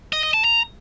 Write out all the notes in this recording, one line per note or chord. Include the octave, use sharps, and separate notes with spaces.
D#5
D#5
A5
A#5